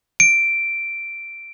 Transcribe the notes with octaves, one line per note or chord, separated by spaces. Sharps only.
D7